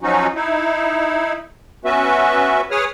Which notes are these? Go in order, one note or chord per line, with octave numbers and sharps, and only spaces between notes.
F3 F#3 C#4 D#4 F#4
D#4 E4
B3 C#4 F#4 B4 E5
G#4 B4 C#5 D#6 F6